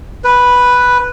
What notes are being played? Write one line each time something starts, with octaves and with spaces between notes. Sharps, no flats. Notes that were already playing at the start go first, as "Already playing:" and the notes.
B4